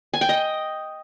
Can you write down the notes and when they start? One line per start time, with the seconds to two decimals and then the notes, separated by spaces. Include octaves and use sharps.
0.14 G#5
0.21 G5
0.29 D#5